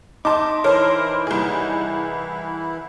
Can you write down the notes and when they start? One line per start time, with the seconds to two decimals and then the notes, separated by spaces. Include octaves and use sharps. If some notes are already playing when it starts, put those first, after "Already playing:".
0.25 D#4 E5 A5 C6 D6
0.64 E3 E4 A#4 C5 C#5 A5
1.27 C2 G#4